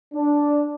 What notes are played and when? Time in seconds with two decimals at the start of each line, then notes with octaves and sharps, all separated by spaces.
0.14 D4